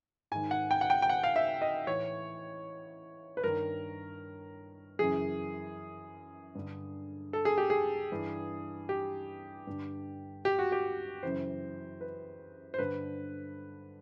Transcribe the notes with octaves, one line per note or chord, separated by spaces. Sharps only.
G#2 D#3 G#5
F#5
G5
F#5
G5
G5
F#5
F5
E5
D#5
A2 E3 C#5
B4
G2 D#3 A#4
F#2 C#3 E3 G#4
G2 D3
A4
G#4
G4
G#4
G2 E3
G4
G2 D3
G4
F#4
G4
F#2 C#3 E3 C5
B4
C5
G2 D3 B4